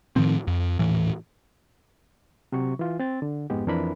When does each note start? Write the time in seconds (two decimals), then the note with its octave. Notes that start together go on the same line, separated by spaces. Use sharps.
0.16 A2 D#3 F3 C4
0.47 F2
0.79 D#1 A2 E3
2.52 C3 F#3 F#4 C#6
2.79 E3 F4
2.99 C4 A6
3.22 D3
3.50 F2 G#2 G#3 B3 G4
3.67 F2 E3 D4 A#4 C5 B5